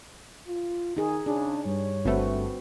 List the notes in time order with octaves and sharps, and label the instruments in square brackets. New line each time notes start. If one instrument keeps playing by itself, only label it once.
[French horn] F4
[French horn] D#3 [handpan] D#4 G#4
[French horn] C#3 [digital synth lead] D4 [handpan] G#4
[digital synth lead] G2 [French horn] C#5
[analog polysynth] G1 A3 [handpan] C4 F#4 B4